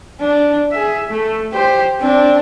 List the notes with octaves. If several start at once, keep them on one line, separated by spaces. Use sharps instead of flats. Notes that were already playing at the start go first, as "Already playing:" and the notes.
D4
G#4 E5
A3
G4 C5
C4 D4